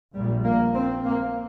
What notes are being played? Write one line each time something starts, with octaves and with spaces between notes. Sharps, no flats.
A#1 A#2 G3
A#3
C4
A#3